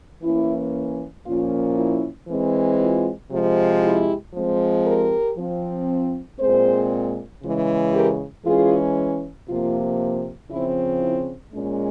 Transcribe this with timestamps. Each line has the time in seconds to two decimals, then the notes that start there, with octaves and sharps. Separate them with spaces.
0.23 E3 A#3 C#4 E4
1.25 A#2 F3 A#3 C#4 F4
1.76 E4
2.28 E3 G#3 C4
2.79 F4
3.31 C3 F3 G#3
3.83 E4 G4
4.34 F3 G#3 C4
4.86 G4 A#4
5.37 F3 C4
6.39 A#2 G#3 C4 G#4 C5
7.43 C#3 E3 G#3
7.93 G4 A#4
8.45 E3 G#3 C#4 F4 G#4
9.48 C3 F3 A#3 F4
10.51 C#3 F3 C4 E4
11.02 E4
11.53 A#2 G#3 C#4